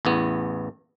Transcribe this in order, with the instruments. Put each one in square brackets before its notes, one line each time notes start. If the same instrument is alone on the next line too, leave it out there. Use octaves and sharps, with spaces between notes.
[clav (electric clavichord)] A1 E2 B3